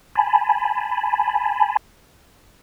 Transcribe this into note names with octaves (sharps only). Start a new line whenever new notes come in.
G#5 A5 B5